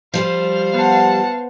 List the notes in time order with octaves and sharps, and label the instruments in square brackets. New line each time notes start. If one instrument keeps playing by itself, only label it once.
[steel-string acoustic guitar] F3 G3 [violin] C5 F5
[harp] B3 [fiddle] F#5 A5